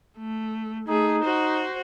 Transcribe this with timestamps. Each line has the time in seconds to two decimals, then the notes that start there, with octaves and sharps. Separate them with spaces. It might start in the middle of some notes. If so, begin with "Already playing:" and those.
0.19 A3
0.88 A3 D#4 G#4
1.24 F#4 C5